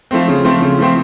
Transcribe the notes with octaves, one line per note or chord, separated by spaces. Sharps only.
F3 A3 C4
C#3
F3 A3 C4
C#3
F3 A3 C4